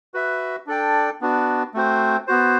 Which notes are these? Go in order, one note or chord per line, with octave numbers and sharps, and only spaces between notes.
F#4 B4 E5
D4 A4 D5 G5
B3 D4 F#4
A3 C4 F#4 C5
B3 F#4 C5